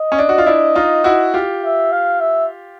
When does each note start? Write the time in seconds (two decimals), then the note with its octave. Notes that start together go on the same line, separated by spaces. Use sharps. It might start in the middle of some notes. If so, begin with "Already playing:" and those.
Already playing: D#5
0.12 C#4
0.19 D4
0.29 F#4
0.38 F4
0.46 D4 E4
0.76 D#4 F4
1.04 E4 F#4
1.34 F4 G4
1.63 E5
1.92 F5
2.20 E5